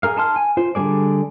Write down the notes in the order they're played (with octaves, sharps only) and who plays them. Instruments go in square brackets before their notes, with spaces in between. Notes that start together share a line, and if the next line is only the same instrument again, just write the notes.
[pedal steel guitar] G#4 A#4 F5
D#4 A5 C6 F6
G#5
F4 C5
D3 G3 A#3 G#4 D5